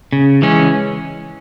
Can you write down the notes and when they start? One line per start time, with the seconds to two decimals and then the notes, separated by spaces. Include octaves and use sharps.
0.12 C#3
0.42 E3 G#3 C#4